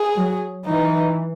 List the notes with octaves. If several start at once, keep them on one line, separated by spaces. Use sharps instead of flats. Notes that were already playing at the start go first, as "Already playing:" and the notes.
Already playing: G#4
F#3
E3 D#4